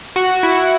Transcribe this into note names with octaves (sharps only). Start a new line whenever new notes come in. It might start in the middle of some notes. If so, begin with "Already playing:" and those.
F#4
E4